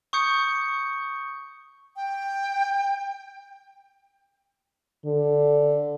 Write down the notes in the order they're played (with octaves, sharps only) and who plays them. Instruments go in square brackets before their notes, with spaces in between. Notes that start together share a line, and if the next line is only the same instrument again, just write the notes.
[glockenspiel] C#6 D#6 G6 C#7
[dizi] G5
[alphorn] D3